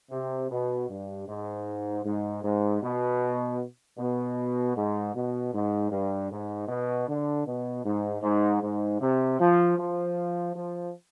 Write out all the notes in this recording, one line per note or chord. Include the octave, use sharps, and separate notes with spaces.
C3
B2
G2
G#2
G#2
G#2
B2
B2
G#2
B2
G#2
G2
G#2
B2
D3
B2
G#2
G#2
G#2
C3
F3
F3
F3